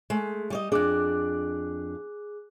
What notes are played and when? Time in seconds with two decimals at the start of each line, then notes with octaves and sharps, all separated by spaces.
0.10 G#3 A3
0.50 G3 C#5 D#5
0.72 F2 D4 G#4 D6 F#6